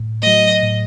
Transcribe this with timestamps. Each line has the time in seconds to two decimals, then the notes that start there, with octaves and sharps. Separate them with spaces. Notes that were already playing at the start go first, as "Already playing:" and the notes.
Already playing: A2
0.22 F#3 A3 D#5
0.63 A2